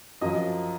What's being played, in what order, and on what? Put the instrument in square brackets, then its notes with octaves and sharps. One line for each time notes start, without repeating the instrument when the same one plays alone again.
[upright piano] F#2 F3 D#5